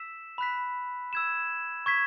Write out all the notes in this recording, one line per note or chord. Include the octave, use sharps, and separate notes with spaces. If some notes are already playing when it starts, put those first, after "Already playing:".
Already playing: E6 B6 E7
B5 F#6 B6
E6 G#6 E7
C#6 G#6 B6 E7